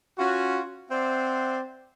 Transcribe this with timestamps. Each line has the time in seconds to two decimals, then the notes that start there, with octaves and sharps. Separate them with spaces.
0.19 C#4 F4 F#4
0.91 C4 C5 D5 E5 F#5